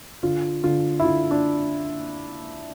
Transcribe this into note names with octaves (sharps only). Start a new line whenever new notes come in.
D3 F4
D3 F4
E4
D3 F4
D4